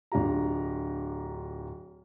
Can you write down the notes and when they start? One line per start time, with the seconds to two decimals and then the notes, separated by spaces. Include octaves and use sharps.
0.12 D1 D3 F4 G4 A#5